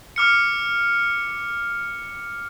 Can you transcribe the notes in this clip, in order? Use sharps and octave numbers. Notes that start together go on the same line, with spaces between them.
D6 F6 C#7